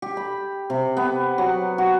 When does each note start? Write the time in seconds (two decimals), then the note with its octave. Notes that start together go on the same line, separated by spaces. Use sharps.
0.02 G4
0.17 B5
0.70 C3
0.97 B3
1.38 F#3
1.78 F#4